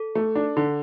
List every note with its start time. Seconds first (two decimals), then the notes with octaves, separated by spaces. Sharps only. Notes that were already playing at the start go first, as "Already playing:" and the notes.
Already playing: A4
0.15 A3
0.35 D4
0.57 D3